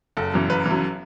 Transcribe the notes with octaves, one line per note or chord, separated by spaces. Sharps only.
F#1 A4
F#2 E3
F#1 B4
F#2 E3